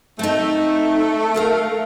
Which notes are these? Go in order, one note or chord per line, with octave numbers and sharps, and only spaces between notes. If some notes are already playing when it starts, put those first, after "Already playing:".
A3 C4 D#4
A4 A#4 F5